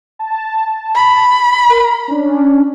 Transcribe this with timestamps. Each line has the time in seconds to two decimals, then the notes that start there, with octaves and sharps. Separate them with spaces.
0.19 A5
0.95 B5
1.70 A#4
2.08 C#4 D4